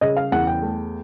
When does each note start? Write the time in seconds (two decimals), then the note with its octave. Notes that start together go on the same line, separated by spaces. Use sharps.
0.01 C#3 D#5
0.17 F5
0.32 E2 F#5
0.47 G5
0.62 A3